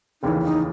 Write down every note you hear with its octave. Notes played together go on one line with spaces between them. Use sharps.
F1 D#2 C#3 E3 D#4
E4
D#4